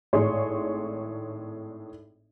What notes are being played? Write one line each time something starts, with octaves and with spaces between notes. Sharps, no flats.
G#1 A2 G#4 C#5 D5 C6